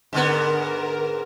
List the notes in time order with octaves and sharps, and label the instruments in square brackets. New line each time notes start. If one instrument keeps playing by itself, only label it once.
[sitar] G#2 D3 B3 [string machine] A#4